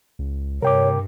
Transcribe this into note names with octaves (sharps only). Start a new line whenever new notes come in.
C#2
G2 C3 A#4 C#5 G5 D6